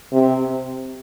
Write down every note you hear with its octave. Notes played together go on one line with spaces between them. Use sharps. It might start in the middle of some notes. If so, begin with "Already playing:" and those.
C3